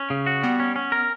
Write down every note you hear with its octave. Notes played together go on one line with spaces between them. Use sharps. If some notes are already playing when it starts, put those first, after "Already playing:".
Already playing: C#4
C#3
F#4
G3 B3
C#4
C#4
A#4